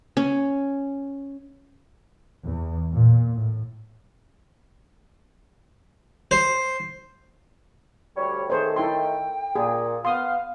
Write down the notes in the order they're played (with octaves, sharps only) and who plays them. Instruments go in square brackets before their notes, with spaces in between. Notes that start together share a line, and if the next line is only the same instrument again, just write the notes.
[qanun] C#4
[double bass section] E2
A#2
A2
[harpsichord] C5
[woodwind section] D2 G3 C#5
[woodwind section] D#3 A3 [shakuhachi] G#4 [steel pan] C5 C#5
[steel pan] E4 A4 C6 [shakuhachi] G5
[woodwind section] A#2 [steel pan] G#4
[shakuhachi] B3 [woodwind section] F5 [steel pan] C6 D#6